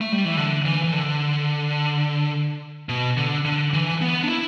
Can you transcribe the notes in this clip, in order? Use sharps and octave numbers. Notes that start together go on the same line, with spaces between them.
A3
G3
E3
D3
E3
E3
D3
B2
D3
D3
E3
B3
D4
E4